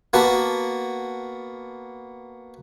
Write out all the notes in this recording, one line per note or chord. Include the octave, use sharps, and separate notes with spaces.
A#3 B3 F#4 A5